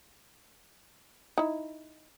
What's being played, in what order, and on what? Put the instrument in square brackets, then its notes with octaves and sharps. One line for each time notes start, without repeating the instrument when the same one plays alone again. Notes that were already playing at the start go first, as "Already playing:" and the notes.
[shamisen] D#4 E4